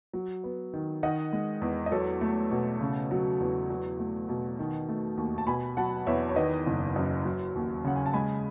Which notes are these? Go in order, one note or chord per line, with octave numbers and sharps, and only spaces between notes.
F#3
B3
D#3
D#3 D#5 F#5
G#3
E2
D#5
F#3 A4 C#5
A3
B2
C#3
F#3
E2
F#3
A3
B2
D#3
A3
D#2
A5
B2 G#5 B5
F#3 F#5 A5
E2 C#5 E5
C#5
D#3 B4 D#5
F#1
F#2
F#3
D#2
C#3 F#5
G#5
A5
G#3 G#5 B5